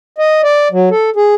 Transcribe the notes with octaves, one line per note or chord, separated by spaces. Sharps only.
D#5
D5
F#3
A4
G#4